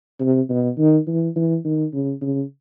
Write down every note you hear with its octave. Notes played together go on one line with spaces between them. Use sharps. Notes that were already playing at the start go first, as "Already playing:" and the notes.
C3
B2
D#3
E3
E3
D#3
C#3
C#3